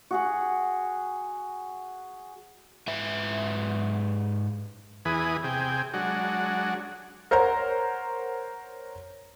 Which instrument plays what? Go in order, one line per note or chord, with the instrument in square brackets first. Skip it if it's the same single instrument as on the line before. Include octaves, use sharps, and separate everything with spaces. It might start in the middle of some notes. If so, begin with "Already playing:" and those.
[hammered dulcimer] F#4 G#4 F#5
[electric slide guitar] G#2 B4 E5
[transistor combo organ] E2 E3 G#4 B4 D#6
C3 G#4 G5
F#3 G#3 D4 F#4
[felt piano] A#4 C5 C#5 F#5 A#5